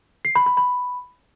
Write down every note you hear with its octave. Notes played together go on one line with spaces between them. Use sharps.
C7
B5
B5
B5